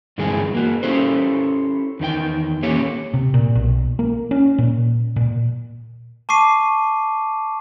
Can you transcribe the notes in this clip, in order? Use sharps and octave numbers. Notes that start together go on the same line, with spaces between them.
G2 D3 E3 G#3 C4 G#4
A#3 F#4
C#4 E4 G4 A4 C5
E2 D#3 E4 G5
A3 A#3 C#4 G4 C#5
C3
A#2
B1
A#3
C#4
A#2
A#2
A5 C#6 D6 C7 D#7